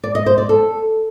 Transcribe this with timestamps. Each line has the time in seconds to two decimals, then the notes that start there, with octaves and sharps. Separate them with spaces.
0.04 D5
0.15 D#5
0.26 C5
0.38 D5
0.49 A4